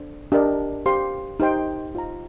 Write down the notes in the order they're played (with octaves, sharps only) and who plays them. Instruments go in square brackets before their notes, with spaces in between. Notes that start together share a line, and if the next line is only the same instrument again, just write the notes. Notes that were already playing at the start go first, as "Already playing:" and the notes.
Already playing: [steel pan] D4 A4 C5
D4 G4 A#4 D#5
G4 C5 F5 C6
D#4 G4 C5 G5 C6
F4 C5 D#5 A#5